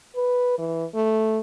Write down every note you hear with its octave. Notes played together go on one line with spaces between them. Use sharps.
B4
E3
A3